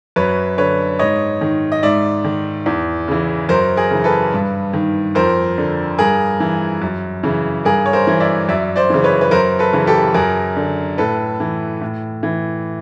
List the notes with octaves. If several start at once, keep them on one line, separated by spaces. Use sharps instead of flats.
F#2 B4 C#5
D3 B4 C#5
G#2 C#5 D#5
D#3
D#5
G#2 D5 E5
D#3
E2
C#3 E3
F#2 A#4 C5
G#4 A#4
C#3 E3
A4 B4
G2
D#3
F2 A#4 C5
D3
G2 G#4 A#4
E3
F#2
C#3 E3
G2 G#4 A#4
C#5
A#4 C5
E3
D5 E5
F#2 D5 E5
C5 D5
C#3 E3
B4 C#5
B4
F#2 A#4 C5
A4 B4
C#3 E3
G4 A4
F#2 G#4 A#4
D3
A2 A4 B4
E3
A2
E3